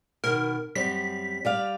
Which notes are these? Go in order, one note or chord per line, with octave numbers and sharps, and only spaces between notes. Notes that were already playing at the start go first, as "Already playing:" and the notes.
B2 D#3 A#4
F#2 G3 C4 B6
G3 D5 F5